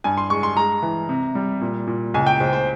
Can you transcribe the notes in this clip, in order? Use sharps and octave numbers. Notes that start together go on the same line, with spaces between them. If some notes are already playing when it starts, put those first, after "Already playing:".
G2 G#5
C6
G#3 C#6
C6
G#3 A#5
E3
C3
G3
A#2
A#2
C#2 G#5
G5
C#2 C5
C5